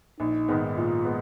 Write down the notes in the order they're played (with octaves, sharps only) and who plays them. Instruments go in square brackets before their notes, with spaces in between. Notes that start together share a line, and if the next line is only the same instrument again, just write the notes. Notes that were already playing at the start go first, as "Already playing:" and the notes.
[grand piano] A#1 [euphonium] D#4
[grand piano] G#2 D#3 G#3 B3
[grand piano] A#1 [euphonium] F4
[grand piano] G#3 B3